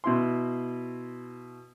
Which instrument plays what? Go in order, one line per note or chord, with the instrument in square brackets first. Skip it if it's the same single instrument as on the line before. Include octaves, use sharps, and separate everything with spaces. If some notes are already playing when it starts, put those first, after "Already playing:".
[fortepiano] B2 E4 C6